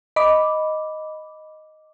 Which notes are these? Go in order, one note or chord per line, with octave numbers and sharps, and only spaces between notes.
D#5 B5 D6